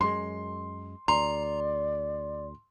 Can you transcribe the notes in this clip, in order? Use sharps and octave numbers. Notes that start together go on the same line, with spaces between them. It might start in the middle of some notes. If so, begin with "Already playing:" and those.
F#2 G#3 C6
D2 D5 A#5 C6